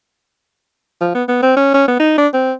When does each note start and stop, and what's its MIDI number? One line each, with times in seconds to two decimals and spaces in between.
1.01 1.11 53
1.15 1.24 59
1.28 1.40 59
1.43 1.54 60
1.57 1.73 61
1.74 1.86 61
1.88 1.97 59
2.00 2.15 63
2.18 2.27 62
2.34 2.53 60